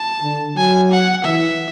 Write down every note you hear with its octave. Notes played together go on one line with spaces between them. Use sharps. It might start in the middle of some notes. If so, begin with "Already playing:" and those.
Already playing: A5
D3
F#3 G#5
F#5
E3 E5